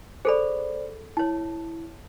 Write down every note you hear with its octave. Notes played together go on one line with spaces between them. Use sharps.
G#4 A4 C5 D5 B5
E4 C#5 A5